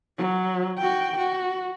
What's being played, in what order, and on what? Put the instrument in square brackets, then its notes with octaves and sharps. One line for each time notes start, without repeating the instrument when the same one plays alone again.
[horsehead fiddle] F#3
F#4 G5
F#4